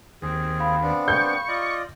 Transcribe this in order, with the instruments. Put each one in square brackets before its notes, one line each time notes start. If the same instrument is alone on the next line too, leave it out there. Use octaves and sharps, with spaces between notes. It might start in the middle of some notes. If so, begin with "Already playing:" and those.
[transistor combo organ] D#2 [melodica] C4 G#4
[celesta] F5 B5
[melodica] B3 C4 D4
[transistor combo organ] C#6 [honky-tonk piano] G6
[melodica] F4 D5 D#5